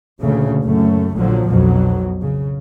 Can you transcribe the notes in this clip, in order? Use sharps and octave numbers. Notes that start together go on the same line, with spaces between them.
D2 A#2 C#3 A3
F#1 F#2 A3
A#1 A#2 D3 F3 F#3
B1 F2 B2 F#3
C#3